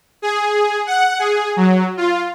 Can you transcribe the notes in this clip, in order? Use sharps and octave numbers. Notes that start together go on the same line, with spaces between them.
G#4
F#5
G#4
F#3
F4